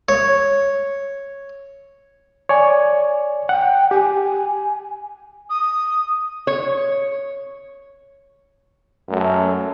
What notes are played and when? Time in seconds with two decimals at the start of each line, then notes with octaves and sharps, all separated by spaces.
0.09 C#5
2.49 C#5 D5 G#5
3.49 F#5 G5
3.91 G4 G#5
5.50 D#6
6.47 C#5
9.09 F#2 A3